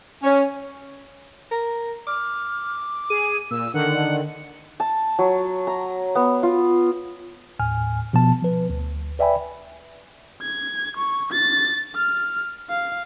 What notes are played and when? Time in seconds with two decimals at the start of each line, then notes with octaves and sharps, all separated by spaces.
0.23 C#4
1.51 A#4
2.07 D6 F6
3.10 G#4 D#7
3.51 A#2 E6
3.74 D3 D#3 F#5
4.80 A5
5.19 F#3
5.67 A#5
6.15 B3
6.43 F4
7.59 D#2 A2 G#5 F6
8.13 B2 F3 B3 A5
8.42 F3 B4
8.70 D2
9.19 B4 D5 E5 G5 G#5 B5
10.42 G#6
10.97 C#6
11.32 A6
11.96 F6
12.69 F5